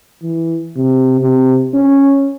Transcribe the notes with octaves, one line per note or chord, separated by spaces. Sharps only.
E3
C3
C3
C#4